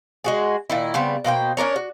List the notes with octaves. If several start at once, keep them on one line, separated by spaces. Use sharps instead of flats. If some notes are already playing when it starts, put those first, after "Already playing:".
G#3 F#4 G#4
A#2 D#3 E4
C#3 G3 B3 C4
B2 A#3 C5 G5
C#4 D4 A#4 C#5
F#4